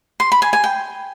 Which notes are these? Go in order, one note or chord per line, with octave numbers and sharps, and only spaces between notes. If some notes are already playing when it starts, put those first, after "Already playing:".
C6
B5
G#5
G#5
G5